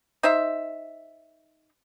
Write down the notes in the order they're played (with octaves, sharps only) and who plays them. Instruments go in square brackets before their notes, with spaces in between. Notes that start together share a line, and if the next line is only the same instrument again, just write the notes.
[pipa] D#4 C5 E5